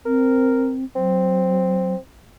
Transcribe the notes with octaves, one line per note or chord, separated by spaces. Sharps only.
C4 A#4
F#3 C4